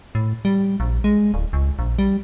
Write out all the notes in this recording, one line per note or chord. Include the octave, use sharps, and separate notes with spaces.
A2
G3
A#1
G#3
D1
C#2
A#1
G3